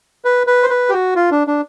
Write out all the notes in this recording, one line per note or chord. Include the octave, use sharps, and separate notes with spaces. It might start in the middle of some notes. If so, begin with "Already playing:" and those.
B4
B4
C5
B4
G4
F#4
F4
D4
D4